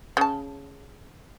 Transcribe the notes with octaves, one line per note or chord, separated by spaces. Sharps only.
C#3 A5